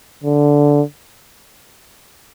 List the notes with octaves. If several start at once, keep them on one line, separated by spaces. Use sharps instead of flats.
D3